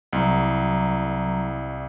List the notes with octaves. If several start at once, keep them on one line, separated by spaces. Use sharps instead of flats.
C2 F#3 A#5